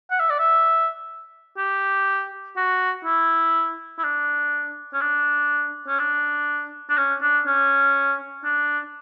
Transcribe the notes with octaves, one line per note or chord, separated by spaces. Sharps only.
F#5
E5
D5
E5
G4
F#4
E4
E4
D4
C#4
D4
C#4
D4
D4
C#4
D4
C#4
D4